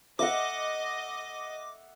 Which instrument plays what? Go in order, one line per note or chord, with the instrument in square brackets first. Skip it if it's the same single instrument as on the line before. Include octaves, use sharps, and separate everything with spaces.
[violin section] D#5 [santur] E5 F#5 [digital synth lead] D6